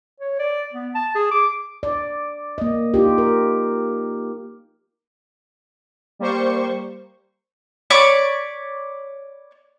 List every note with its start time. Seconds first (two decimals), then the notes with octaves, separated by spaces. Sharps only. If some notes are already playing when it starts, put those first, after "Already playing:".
0.20 C#5
0.39 D5
0.73 B3
0.95 A5
1.15 G#4
1.31 D6
1.83 D5
2.58 A#3 D#5
2.94 D#4 F4 G4
3.18 A#4
6.19 G3 A#3 G4 C5 C#6
7.90 C#5 D5 B5 D6